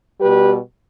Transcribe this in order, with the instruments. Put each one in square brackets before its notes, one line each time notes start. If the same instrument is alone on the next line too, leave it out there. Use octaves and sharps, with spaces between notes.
[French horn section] B2 G3 G4 B4